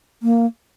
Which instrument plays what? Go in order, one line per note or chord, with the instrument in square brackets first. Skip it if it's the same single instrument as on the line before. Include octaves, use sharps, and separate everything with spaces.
[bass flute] A#3